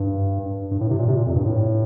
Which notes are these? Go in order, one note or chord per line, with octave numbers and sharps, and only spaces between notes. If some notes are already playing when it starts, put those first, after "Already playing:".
Already playing: G2
G2
A2
C3
A#2
C3
A#2
F2
G2
A2